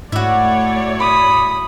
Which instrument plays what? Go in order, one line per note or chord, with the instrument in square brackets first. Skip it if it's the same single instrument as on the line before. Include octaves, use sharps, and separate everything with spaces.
[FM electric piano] G#2 [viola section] A3 C#5 D5 [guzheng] E4 F#4
[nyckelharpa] B5 D#6